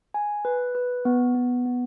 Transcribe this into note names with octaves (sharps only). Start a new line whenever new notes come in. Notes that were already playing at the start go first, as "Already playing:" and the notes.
G#5
B4
B4
B3
B3
B3